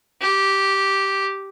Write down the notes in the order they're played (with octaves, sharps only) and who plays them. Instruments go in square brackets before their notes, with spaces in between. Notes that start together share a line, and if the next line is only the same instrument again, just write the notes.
[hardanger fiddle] G4